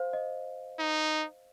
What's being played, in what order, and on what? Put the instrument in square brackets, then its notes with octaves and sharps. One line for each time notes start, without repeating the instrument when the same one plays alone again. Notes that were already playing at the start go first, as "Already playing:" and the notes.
Already playing: [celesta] C5 F5
D#5
[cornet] D#4